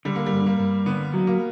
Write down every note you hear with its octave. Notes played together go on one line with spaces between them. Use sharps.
D3 G3
A#3
G3
G2
A#3
G2
D3 B3
F#3
A#3